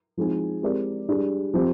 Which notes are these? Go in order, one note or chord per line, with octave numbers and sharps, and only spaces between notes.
F3 G#3 C4 D#4 G#4
G#3 C4 G4 A#4 D5
G3 D4 G#4
F3 C4 G4